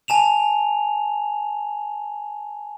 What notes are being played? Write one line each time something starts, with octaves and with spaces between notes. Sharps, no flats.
G#5 A5 E7 F7